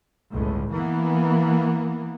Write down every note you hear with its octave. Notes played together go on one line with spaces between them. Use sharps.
G1 C#2 A2
E3 A#3 B3